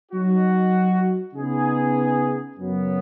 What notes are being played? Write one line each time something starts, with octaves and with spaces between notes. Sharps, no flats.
F#3 D#4 F#4
C#3 B3 D#4 G#4
F#2 C#3 F#3 B3